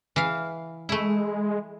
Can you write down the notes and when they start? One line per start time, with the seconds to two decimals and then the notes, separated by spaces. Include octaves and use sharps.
0.16 E3 F5
0.89 G#3 A3 E4